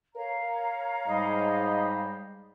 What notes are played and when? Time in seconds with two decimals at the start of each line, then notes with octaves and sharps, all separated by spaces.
0.15 A#4 C#5 F5 A#5
1.07 G#2 G3 D#5